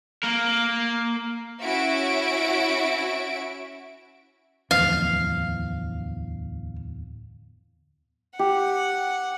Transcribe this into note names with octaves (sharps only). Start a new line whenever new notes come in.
A#3 A#4
C#4 E4 F#4 E5 D7
D1 E2 F3 F5
G4 F#5